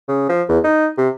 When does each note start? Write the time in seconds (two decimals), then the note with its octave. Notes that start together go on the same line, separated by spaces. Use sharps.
0.08 C#3
0.29 F3
0.49 E2
0.64 D#4
0.97 C3